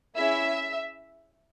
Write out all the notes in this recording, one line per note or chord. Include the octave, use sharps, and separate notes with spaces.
C#4 E4 G#4 E5